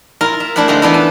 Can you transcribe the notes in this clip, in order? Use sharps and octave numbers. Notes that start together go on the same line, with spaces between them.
E4 F4 A#4
E5
A3 C4 D4 E4 E5 F#5
D3 G#3 A3 F4 G#4
E3 B3 D4 E4
A5